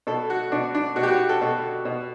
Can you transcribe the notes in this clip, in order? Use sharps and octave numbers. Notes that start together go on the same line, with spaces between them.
B2 A4
F#4
B2 D4
D4
B2 F#4
G4
F#4
G4
A4
B2
B2